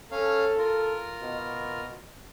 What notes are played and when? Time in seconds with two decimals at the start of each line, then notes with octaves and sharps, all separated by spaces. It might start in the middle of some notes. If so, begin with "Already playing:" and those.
0.11 C#4 A4 C#5 F5
0.58 F4 A#4
1.22 B2